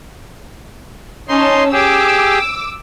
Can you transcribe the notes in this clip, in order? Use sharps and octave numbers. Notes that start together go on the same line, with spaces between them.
C#4 D#4 C#5 A5 C6
G4 G#4 D6 E6